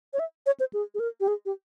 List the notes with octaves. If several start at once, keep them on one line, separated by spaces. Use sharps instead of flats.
C#5
E5
C#5
C5
G#4
G#4
A#4
G4
G#4
G4